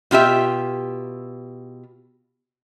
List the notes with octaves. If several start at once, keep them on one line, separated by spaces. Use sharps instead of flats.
B2 F4 G4 E5